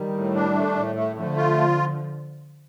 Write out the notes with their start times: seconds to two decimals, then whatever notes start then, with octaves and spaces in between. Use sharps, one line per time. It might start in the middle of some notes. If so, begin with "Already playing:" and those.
Already playing: D#3 G3
0.13 A2
0.34 D4
0.54 A3
0.75 A2
0.95 A3
1.16 D3 F3 A3
1.36 F4